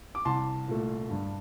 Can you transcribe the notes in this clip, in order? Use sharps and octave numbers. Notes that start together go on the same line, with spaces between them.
D6
C2 A5 C6
A#2 A3
G2